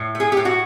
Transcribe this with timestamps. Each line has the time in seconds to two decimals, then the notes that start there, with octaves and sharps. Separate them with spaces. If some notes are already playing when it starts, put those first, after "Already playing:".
Already playing: A2
0.15 A3
0.20 G#4
0.32 A2 G4
0.45 F#4